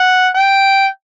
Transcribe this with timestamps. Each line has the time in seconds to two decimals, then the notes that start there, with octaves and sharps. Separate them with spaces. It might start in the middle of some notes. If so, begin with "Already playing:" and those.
Already playing: F#5
0.35 G5